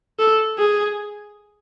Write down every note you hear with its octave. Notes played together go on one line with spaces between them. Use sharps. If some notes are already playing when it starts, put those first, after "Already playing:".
A4
G#4